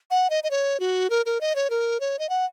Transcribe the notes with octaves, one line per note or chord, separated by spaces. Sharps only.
F#5
D#5
D#5
C#5
F#4
A#4
A#4
D#5
C#5
A#4
C#5
D#5
F#5